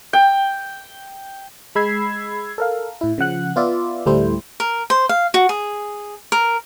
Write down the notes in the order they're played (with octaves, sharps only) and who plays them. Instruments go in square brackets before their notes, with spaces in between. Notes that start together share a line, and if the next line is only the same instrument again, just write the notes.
[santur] G5
[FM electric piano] G#3 B5 E6 G#6 C7
A4 A#4 F5
A2 E4
C#3 F3 F#5 F#6
B3 F4 D5 E5
D2 A2 G3 A3 E4 C5
[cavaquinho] A#4
C5
F5
F#4
G#4
A#4